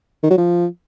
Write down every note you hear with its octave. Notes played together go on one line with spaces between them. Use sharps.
D#3
F#3
F3